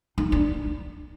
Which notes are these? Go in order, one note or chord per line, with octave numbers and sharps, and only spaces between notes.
D#4
D4